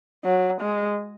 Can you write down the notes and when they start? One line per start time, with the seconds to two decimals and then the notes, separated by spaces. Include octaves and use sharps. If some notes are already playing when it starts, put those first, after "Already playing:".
0.25 F#3
0.61 G#3